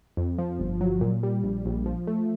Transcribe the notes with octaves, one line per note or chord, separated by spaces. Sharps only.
F2
F3
G1
F#3
A#2
G3
A#1
A#1
F3
A3